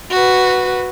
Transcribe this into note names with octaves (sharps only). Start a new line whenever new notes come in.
F#4 B4